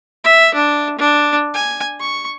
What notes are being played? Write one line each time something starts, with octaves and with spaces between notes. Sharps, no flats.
E5
D4
D4
G#5
C#6